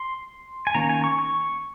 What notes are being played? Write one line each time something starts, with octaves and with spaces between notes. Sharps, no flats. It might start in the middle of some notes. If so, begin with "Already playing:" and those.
Already playing: C6
G#5
D#3 A#3 C#4 A#5
G#5
C#6
C#6